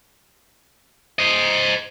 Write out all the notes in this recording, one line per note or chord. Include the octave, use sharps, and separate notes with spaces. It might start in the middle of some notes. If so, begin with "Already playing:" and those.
C5 D#5